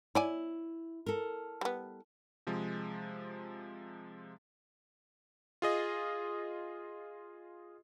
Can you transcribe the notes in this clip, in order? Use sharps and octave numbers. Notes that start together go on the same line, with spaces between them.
E4 C#5 D5 G#5
A4 A#4
G3 B3
C3 F3 G#3
F4 G#4 D#5